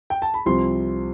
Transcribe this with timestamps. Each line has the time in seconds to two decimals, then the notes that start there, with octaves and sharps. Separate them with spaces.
0.10 G5
0.22 A5
0.34 B5
0.46 C2 C3 F3 C4 C6